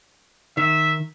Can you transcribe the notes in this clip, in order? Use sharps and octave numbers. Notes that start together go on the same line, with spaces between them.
D#3 E5